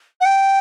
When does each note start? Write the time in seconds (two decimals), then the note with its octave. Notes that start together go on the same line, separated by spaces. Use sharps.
0.21 F#5
0.25 G5